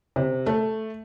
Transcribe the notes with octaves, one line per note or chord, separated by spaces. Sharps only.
C3
A3